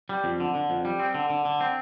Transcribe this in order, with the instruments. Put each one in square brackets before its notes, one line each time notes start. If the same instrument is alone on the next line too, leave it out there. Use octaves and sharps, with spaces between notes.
[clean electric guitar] G3
F2
D3
D3
F2
G3
C4
D3
D3
D3
C4